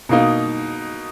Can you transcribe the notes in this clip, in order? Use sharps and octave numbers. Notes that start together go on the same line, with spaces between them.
B2 A#3 D#4